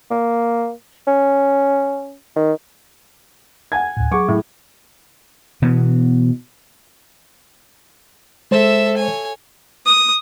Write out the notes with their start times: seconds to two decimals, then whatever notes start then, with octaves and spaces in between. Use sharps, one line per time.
0.11 A#3
1.07 C#4
2.36 D#3
3.72 F#5 G#5 G#6
3.97 D2 A2
4.11 F#3 G#4 F#5 C#6 D6
4.28 A2
5.62 B2 E3 B3
8.51 G#3 A4 C5 E5
8.97 C#5 G#5
9.86 D#6